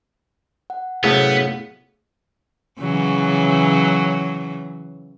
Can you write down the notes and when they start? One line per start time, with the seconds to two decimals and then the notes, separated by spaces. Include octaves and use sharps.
0.70 F#5
1.04 F#2 A2 C3 A3 B3 G#4 F5 F#5
2.79 C#3 E3 F#3